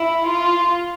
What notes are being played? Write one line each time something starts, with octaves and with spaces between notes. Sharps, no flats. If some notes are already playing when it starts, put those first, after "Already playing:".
Already playing: E4
F4